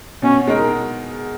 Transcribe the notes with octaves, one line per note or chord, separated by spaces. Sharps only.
B2 C#4
G#3 D#4 A#4